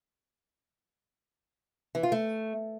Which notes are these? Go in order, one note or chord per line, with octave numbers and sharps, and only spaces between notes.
E3
F4
A3